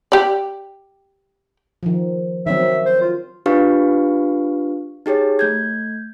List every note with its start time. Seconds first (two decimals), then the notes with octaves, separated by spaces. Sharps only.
0.12 G4 D5
1.83 D#3 F3
2.47 D#3 F#3 C4 E5
2.86 C5
3.01 F4
3.46 D4 F4 G4 B4 F5 C#6
5.06 D#4 G4 G#4 C#5
5.39 A3 G6 G#6